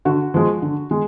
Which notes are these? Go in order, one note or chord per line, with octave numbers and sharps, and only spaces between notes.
D3 F#4
F3 G#3
D3
G#3